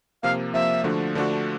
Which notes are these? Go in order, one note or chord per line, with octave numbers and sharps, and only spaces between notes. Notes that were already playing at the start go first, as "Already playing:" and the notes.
C3 F3 A#3 F5
C3 F3 A#3 E5
D3 F3 A3 D4 F#4
D3 F3 A3 D4 F#4